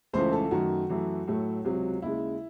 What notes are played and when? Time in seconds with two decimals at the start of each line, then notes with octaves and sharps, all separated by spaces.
0.13 C#2 C#3 E3 A3 C5
0.33 A4
0.51 F#2 D#3 A3 F#4
0.90 F#2 E3 A3
1.28 A2 F#3 A3
1.64 C#2 C3 F#3
2.02 D#2 C#3 G#3 E4